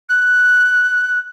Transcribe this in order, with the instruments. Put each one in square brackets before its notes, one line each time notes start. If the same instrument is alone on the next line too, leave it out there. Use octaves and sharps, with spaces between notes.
[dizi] F#6